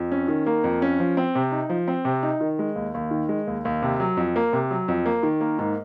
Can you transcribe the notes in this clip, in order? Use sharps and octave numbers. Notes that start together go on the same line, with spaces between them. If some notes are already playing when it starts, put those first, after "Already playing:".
Already playing: F2
C#4
D#3
A#3
F2
C#4
F3
C4
C3
D#4
F3
C4
C3
D#4
D#3
G#3
D#2
D#2
D#3
G#3
D#2
D#2
C3
F#3
F2
A#3
C3
F#3
F2
A#3
D#3
A#3
G#2